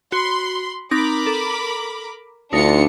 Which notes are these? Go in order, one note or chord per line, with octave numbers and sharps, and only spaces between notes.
F#4 B5 C6
C4 D#4 A#4 B5 D6 A#6
A4
D2 D4 D#4 F4 C#7